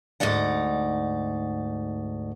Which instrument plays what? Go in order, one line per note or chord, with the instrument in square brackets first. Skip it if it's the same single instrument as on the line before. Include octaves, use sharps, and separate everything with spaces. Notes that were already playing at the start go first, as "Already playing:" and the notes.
[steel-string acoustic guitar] D2 G#2 D#4 D5 F#5